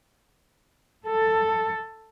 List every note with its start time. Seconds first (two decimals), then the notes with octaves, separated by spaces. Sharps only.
1.05 A4